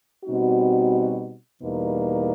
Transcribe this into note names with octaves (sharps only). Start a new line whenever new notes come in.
B2 G3 C4 D#4 F#4
E2 B2 G3 A#3 D#4